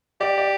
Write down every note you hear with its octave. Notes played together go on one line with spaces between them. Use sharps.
G4 D5
D5